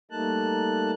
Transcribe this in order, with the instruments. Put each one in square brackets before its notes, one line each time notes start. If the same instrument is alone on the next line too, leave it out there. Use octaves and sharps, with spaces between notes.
[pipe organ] G3 A3 A#3 D#4 A5 F#6